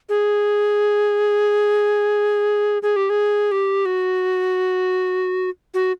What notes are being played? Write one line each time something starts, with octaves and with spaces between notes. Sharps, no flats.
G#4
G#4
G4
G#4
G4
F#4
F#4